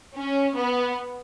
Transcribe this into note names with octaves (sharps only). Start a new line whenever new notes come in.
C#4
B3